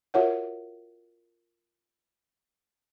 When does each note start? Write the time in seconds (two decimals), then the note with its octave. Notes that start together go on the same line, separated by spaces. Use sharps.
0.14 F4 F#4 A#4 C#5 E5 F#5